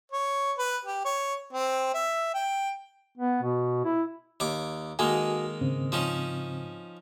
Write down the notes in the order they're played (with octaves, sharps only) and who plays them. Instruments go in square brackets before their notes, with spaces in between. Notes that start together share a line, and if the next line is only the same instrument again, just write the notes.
[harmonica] C#5
B4
G4
C#5
C4
E5
G5
[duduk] B3
B2
E4
[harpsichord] D#2 C#5 D6
[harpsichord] D#3 G#3 A#3 [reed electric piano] F#4 A4 G#5
[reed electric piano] G#2 C#3 C4
[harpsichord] F3 C#4 D#4